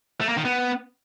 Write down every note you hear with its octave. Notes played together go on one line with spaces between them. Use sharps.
A3
A#3
D#3
B3